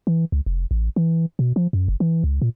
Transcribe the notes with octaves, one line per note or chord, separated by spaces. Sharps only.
E3
C#2
F1
A1
E3
B2
F3
F#2
F#1
E3
C#2
A#2